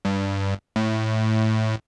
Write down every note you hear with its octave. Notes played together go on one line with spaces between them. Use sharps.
G2
A2